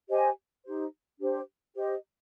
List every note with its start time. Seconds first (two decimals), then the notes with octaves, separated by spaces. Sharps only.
0.09 G4 C5 D#5 G#5
0.65 D#4 G4 C5
1.19 D4 G4 C5
1.75 G4 C5 D#5